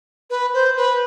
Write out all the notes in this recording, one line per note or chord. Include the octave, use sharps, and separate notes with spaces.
B4
C5
B4